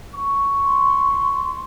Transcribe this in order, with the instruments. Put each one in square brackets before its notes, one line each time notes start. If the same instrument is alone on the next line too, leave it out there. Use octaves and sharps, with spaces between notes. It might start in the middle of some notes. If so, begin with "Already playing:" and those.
[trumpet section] C#6
[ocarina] C6